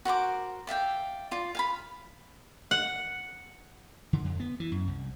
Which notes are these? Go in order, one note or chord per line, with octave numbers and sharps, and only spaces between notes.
F#4 A#4 C5 D6
D5 E5 F5 G5
F4 D5
F5 G#5 B5
F#5
D3
F2
B3
E3
F#2
C2